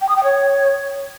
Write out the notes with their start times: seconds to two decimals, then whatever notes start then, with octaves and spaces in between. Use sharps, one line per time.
0.01 G5
0.09 D#6
0.16 G5
0.24 C#5